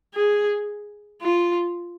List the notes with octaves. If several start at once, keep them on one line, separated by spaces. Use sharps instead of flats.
G#4
F4